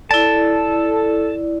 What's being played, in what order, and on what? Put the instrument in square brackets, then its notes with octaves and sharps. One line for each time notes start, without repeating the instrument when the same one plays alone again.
[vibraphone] E4 D5 [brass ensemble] A4 [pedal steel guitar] A5